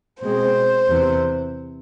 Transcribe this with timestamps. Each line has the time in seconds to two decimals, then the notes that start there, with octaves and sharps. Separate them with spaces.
0.21 B2 G#3 C4 C5
0.89 E2 C3 E3